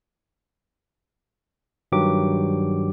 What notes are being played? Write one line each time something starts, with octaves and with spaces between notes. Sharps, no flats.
G2 D#3 F#3 G4 D6